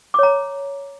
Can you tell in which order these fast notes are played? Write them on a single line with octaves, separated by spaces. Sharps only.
D6 C#5 A#5